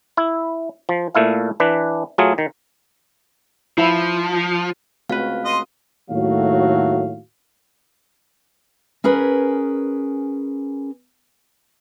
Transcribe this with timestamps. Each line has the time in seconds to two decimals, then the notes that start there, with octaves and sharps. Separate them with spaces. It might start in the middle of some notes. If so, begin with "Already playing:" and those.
0.17 E4
0.89 F3
1.15 A#2 A3 E4 F5
1.60 E3 D4 B4
2.18 F#3 A3 F4 G#4
2.38 D#3
3.78 F3 E4
5.10 C#2 A3 C4 F#4 B4 F5
5.45 D#5 C6
6.10 D#2 A2 F#3 A3 F#4 F5
9.04 C#4 G#4 A#4 B4